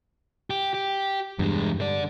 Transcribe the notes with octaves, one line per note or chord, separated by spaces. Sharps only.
G4
G4
E2 G2 G#3
D3 D5